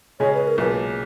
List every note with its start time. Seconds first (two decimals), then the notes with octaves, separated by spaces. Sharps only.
0.20 C#3 G#3 C#4 G#4 C#5 D#5
0.34 B4
0.47 A#4
0.57 B1 A#2 G#3 B4